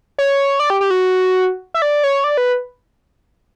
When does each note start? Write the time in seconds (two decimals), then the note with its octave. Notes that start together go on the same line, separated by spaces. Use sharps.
0.18 C#5
0.60 D5
0.70 G4
0.81 G4
0.90 F#4
1.74 E5
1.82 D5
2.04 C#5
2.24 D5
2.37 B4